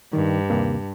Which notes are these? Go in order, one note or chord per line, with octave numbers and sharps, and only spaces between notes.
G2 D#3
D#2 C3 A#3